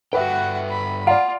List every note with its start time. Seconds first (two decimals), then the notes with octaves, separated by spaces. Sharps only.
0.13 G2 F#4 A4 B4 E5 F#5 G5
0.69 B5
1.07 F4 D5 F5 F#5